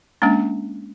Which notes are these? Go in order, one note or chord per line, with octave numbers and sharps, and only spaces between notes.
G#3 A#3 C#4 D4